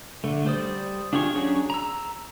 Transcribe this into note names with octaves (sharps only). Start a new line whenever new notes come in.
D3 A3
G3 C5 D5 D#6
D4 F4 G4 G#4 C#6
F#3 C#4 D4 G#4 C#5
A#5 E6